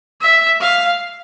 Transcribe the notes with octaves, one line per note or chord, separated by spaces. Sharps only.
E5
F5